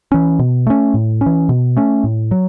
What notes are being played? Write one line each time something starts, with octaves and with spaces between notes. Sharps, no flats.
E3 C#4
B2
A3 C#4
A2
C#4
E3
B2
A3 C#4
A2
F#3